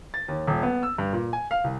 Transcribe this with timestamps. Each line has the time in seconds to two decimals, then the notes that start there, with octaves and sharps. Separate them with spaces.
0.14 A6
0.28 D#2
0.47 D#1
0.63 B3
0.83 E6
0.98 G2
1.13 A#2
1.33 G#5
1.51 F5
1.64 C2